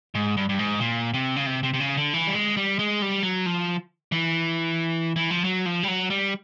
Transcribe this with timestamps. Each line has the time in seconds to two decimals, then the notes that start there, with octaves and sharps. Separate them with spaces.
0.15 G#2
0.37 G2
0.49 G2
0.59 G#2
0.80 A#2
1.14 C3
1.36 C#3
1.46 C3
1.63 C3
1.74 C3
1.80 C#3
1.97 D3
2.14 E3
2.27 G3
2.35 G#3
2.57 G3
2.79 G#3
3.02 G3
3.23 F#3
3.46 F3
4.12 E3
5.16 E3
5.30 F3
5.44 F#3
5.66 F3
5.83 G3
5.88 F#3
6.10 G3